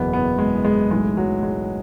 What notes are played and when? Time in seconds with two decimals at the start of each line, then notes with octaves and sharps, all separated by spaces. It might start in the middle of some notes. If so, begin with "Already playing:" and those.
Already playing: F#1 E2 B2 B3
0.13 B3
0.39 G#3
0.65 G#3
0.91 B1 A2 E3 G#3
1.17 F#3
1.43 G#3